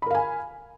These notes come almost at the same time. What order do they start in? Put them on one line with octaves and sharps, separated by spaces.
B5 A#4 F5 G#5